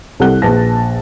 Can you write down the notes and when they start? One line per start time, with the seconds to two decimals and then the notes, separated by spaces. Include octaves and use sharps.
0.20 C2 G3 A4 F#5 F#6 G7
0.42 A#1 B4 A5 A#6